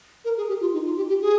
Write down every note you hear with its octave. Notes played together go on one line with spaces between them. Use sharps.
A#4
G#4
G4
F4
D#4
F4
G4
G4
G#4